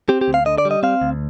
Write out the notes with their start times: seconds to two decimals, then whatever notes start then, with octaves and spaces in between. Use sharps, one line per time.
0.09 C4 G4
0.21 G4
0.28 D2
0.34 F5
0.46 D3 D#5
0.58 D5
0.65 G3
0.71 D#5
0.83 C4 F5
1.02 D2